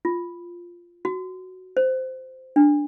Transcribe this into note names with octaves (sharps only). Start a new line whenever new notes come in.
F4
F#4
C5
D4